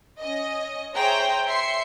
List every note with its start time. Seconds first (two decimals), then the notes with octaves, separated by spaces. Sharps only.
0.20 C#4 D#5
0.94 G#4 C5 C#5 E5 G5 A#5
1.46 E5 C6 C7 C#7